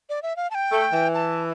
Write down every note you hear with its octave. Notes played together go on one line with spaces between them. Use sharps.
D5
E5
F5
A5
G5
A3
E3
A5